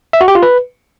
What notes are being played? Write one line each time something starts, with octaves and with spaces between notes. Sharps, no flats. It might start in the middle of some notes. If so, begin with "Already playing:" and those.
E5
F#4
G4
F4
B4